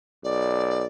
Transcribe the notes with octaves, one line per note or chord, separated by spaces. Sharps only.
B1 D5